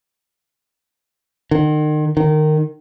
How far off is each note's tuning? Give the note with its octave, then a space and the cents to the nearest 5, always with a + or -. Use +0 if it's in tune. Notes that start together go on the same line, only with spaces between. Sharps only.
D#3 -40
D#3 -20